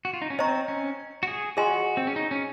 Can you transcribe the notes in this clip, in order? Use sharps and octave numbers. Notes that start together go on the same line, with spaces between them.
F#4
F4
D#4
C#4
C4 C5 D#5 A#5 C#6
C#4
F#4
G#4
F4 F#4 G#4 D#5 G#5 C6
C4
C#4
D#4
C#4